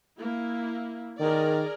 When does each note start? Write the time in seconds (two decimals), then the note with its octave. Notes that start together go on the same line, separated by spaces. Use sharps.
0.19 A#3 E4
1.20 D#3 G#4 A#4 D5